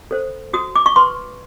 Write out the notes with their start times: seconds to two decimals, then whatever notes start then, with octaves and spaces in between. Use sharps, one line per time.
0.11 A4 C5
0.53 F#4 D#6
0.76 D6
0.86 C#6
0.96 B4 C6